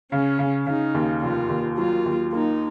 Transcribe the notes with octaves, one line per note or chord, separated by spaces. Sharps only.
C#3 C#4
C#3
C#3 D#4
D#2
F1 F4
D#2
F#3 F4
D#2
A#3 D#4